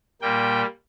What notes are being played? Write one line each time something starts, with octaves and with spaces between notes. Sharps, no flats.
A#2 G3 A#3 G5